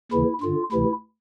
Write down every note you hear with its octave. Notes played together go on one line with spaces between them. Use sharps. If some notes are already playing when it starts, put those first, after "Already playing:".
D#2 C#3 E3 E4
G2 D3 F4
D2 C3 E3 E4